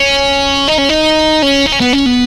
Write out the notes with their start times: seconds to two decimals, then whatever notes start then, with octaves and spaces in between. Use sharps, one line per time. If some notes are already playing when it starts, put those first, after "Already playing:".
Already playing: C#4
0.68 D#4
0.78 C#4
0.89 D#4
1.42 C#4
1.66 D#4
1.72 C#4
1.80 B3
1.93 C#4
2.06 B3